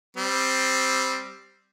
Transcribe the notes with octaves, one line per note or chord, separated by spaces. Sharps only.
G3 C4